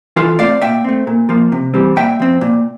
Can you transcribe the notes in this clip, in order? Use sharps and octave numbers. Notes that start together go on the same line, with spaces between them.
E3 F4 A4
A3 C4 D5 F5
A#2 E5 G5
A3 C4
A#2
F3 A#3
C3
E3 G3 C4
A#2 E5 G5
F3 C4
A#2